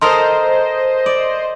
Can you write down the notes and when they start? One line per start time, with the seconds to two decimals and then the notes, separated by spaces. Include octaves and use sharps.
0.01 A4 A#4 C5 D#5 A#5 C6 D#6
1.06 D5